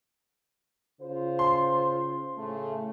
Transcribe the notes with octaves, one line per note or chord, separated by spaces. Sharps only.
C#3 F4 C5
C6
A2 C#3 A3